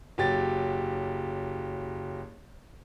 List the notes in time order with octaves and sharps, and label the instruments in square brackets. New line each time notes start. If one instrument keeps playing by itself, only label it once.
[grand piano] F#1 F#3 G4 A6